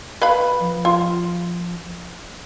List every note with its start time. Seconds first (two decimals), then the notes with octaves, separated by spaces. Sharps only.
0.22 B4 F5 B5
0.60 F3
0.85 F4